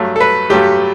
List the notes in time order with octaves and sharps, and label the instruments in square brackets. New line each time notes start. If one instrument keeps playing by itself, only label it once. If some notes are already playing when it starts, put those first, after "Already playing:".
Already playing: [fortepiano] G2 F#3 A3
A4
B4
G2 F#3 A3 G4